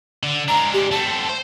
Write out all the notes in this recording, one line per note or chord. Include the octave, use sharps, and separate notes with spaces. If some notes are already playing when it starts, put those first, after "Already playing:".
D3
G#3 D4 A#5
G4
A3 C4 A5
C5